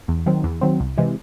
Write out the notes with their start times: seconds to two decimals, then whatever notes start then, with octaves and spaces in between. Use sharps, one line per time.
0.08 E2
0.26 D#3 F#3 C4
0.44 E2
0.61 D#3 F#3 C4
0.80 C2
0.98 C3 E3 G#3